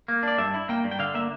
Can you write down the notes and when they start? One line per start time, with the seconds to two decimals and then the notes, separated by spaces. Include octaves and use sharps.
0.08 A#3
0.23 D4 D5
0.38 G2 E5
0.54 E4
0.69 A#3 G5
0.84 G2
0.91 G5
0.99 D3 F5
1.14 A#3 E5